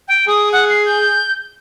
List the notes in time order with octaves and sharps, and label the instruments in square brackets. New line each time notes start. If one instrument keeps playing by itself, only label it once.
[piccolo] G5
[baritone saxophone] G#4 [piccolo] D#6
[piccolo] F#5
C7
G6